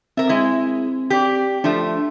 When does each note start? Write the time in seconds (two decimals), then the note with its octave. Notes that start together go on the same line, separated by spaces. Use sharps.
0.17 C4 A#4 E5
0.29 G#3 E4
1.10 G4 D5
1.64 F3 A3 D4